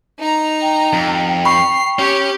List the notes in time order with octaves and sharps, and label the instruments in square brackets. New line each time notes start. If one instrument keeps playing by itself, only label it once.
[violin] D#4 A#5
[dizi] G5
[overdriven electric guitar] F2
[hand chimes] B5 C#6 [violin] C7
[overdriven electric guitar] C#4 C#5 [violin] G4